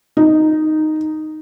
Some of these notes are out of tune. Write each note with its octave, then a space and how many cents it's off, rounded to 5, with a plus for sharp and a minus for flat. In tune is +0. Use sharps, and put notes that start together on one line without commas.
D#4 -5